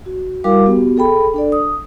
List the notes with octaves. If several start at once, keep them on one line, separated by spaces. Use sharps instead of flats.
F#4
G3 E4 F#4 A#4 F5 D6
B3 F#4 G4
G#4 A4 G5 B5
D4 A4 D5
D#6